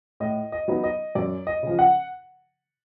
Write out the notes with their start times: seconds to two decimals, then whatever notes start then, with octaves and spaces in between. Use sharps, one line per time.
0.20 A2 D#5
0.52 D#5
0.68 F#3 B3 D#4
0.84 D#5
1.15 F#2 D5
1.47 D#5
1.63 C#3 F3
1.79 F#5